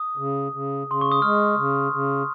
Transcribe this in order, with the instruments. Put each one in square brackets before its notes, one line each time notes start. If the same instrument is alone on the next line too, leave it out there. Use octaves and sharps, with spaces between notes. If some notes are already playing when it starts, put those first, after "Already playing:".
Already playing: [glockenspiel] D#6
[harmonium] C#3
C#3
[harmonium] C#3 [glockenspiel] C6
[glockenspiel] C#6
D#6
[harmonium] G#3 [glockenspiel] F6
[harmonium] C#3
C#3